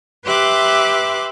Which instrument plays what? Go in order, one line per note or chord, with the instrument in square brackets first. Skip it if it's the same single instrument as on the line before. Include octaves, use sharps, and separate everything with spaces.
[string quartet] G4 B4 E5 C6 D6 F#6